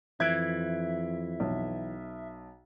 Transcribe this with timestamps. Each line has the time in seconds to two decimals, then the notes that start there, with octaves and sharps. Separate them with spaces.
0.20 F2 E3 E5 G#6 D7
1.40 B1